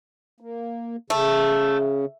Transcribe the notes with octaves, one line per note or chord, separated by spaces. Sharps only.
A#3
C#3 A3